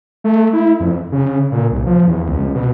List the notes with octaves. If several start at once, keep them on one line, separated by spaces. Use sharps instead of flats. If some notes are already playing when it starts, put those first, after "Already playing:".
A3
E4
F2
C#3
A#2
C2
F3
E2
C#2
B2